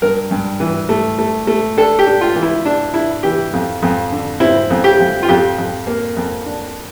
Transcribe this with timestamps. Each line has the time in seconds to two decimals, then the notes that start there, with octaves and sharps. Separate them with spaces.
0.02 G2 A#4
0.31 G2
0.60 E3
0.89 A3
1.19 A3
1.47 A3
1.77 D4 A4
1.99 G4
2.06 D4
2.21 F4
2.35 E3
2.42 E4
2.65 D4
2.94 D4 E4
3.23 E3 G4
3.53 F2
3.82 F2
4.12 D3
4.40 C4 E4
4.70 F2
4.84 G4
5.00 F2
5.23 F4
5.29 F2 G4
5.58 F2
5.87 A#3
6.16 F2
6.46 D4